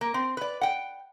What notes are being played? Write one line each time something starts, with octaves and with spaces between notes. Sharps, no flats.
A#3
C4
B4 D5
F#5 G5